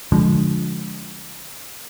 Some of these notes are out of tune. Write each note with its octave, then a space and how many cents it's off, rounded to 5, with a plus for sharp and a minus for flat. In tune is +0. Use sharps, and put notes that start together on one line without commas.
D3 -25 F3 +0 G#3 +0